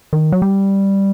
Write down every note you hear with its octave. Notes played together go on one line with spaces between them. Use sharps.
D#3
F#3
G3